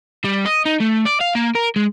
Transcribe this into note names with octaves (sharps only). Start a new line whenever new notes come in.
G3
D#5
D#4
A3
D5
F5
A#3
A#4
G#3